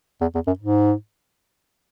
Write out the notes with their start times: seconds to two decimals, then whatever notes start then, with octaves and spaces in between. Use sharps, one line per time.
0.21 E2
0.35 E2
0.47 F#2
0.59 G#2